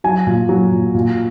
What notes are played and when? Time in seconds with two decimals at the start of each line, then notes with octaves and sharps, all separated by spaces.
0.04 F#3 G#5
0.27 A#2
0.49 F#3
0.72 A#2
0.95 A#2